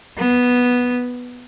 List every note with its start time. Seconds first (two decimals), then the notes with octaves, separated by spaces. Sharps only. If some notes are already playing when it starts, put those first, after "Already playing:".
0.17 B3